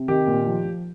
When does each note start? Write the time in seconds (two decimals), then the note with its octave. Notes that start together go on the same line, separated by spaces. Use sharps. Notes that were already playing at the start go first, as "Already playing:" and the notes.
Already playing: C3
0.08 D#3 G4
0.27 A#2
0.46 F3
0.65 F3